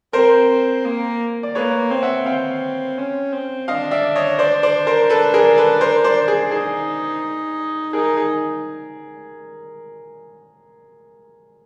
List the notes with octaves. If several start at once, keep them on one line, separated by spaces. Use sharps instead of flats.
C4 A#4 C5
A#3
D5
A#3 B4 C#5
C4
E5 F#5
C4 F5 G5
C#4
C4
D4 D#5 F5
D5 E5
C#5 D#5
C5 D5
C5 D5
A#4 C5
A4 B4
G#4 A#4
A4 B4
A#4 C5
C5 D5
G#4
D#4 G#4
D#4 G#4 A#4
G#4